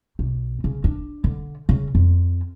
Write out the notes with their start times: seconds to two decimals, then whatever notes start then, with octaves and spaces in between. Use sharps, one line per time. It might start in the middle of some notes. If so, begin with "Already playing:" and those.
0.19 B1
0.64 C#3
0.84 D4
1.24 D3
1.69 C#3
1.95 F2